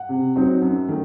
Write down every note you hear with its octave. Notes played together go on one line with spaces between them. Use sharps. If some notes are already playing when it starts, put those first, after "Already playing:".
Already playing: F#5
C3
F#3 C4 D#4
F#2
D#3 A3